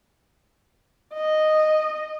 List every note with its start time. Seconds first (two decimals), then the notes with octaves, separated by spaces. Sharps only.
1.14 D#5